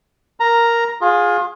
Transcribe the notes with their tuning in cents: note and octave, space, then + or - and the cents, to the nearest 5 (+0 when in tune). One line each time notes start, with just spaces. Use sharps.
A#4 +0 A#5 +0
F4 +25 G#4 +0